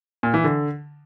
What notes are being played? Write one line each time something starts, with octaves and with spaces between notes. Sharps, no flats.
A#2
E3
D3